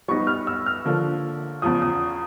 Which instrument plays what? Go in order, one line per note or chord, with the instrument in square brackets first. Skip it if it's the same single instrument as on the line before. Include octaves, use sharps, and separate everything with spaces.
[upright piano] G3 B3 D#4 [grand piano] C#6
[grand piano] F6
E6
F6
[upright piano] D3 F3 A#3
[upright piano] E2 C#3 F3 [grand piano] D#6
[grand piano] D#6